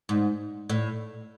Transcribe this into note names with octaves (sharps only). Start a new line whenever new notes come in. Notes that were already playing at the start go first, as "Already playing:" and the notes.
G#2
A2